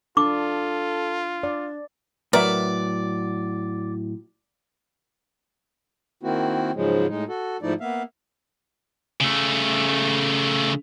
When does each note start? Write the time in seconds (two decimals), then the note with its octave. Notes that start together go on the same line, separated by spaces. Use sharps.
0.17 D4 F4 A4 D6
1.43 D4 D5
2.33 A2 F#3 A#4 B4 D5 E5
6.23 D#3 A#3 C4 E4 F#4
6.75 G#2 C#3 F3 F#3 G#3
7.08 A2 G#3 D#4
7.29 F#4 A4
7.62 G#2 F3 A3 D#4 E4 D5
7.81 A#3 B3 E5 F5
9.21 C#3 A3